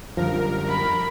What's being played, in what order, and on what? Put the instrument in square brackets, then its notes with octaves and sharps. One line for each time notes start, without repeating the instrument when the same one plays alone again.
[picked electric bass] F#2 D3 G3 [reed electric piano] F3 [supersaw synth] A#4
[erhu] B5